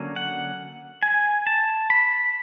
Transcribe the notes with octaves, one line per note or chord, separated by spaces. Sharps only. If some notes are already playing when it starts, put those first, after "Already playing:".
Already playing: D3 F#3 A#3 C#4
F#5
G#5
A5
B5